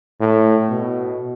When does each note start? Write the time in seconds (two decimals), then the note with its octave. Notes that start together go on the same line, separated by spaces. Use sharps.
0.20 A2
0.70 B2